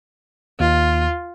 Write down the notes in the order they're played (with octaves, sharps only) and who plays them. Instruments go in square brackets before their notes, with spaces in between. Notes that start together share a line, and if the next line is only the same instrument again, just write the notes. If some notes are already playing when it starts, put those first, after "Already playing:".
[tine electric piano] D#2 [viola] F4